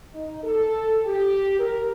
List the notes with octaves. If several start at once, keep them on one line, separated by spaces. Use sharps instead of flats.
D#4
A4
G4
A#4